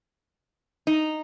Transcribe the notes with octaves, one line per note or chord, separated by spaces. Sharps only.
D#4